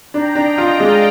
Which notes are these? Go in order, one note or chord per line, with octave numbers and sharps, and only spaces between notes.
D4 G5 A#5
D4
D#5 G5
F4
D5 F5
G#3